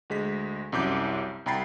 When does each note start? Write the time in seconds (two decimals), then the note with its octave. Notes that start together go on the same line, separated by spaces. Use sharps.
0.10 D2 G#3 B6
0.72 C2 F#2 D6 G6
1.46 C2 G5 A#5 B5 A6 C7